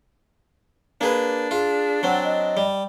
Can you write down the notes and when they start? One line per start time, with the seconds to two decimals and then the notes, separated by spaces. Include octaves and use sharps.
1.01 A#3 D4 G#4 B4
1.51 F4 G#4
2.03 F#3 C4 F#5
2.24 D#5
2.57 G3